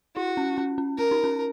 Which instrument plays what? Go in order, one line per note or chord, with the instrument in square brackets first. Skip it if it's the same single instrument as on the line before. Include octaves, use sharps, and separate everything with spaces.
[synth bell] E4 [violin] F#4
[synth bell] C#4
C#4
C#4
[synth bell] C#4 [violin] A#4
[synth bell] D#4
C#4